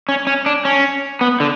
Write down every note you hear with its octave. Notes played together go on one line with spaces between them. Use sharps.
C#4
C#4
D4
C#4
B3
D3